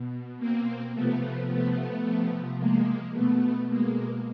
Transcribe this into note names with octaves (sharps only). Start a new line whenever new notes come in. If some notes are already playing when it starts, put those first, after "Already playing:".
Already playing: B2
A#3 C4
C3 F3 A3 B3
A3 B3
C3 F3
G#3 A#3
B2 A3 B3
G#3 A#3